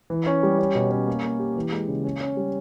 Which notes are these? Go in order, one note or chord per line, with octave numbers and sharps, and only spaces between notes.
E3
C#4
G3
C#4
B2
C#4
A#3
A#3
G4
E3
G#3
C#3
C#4
C#4
G3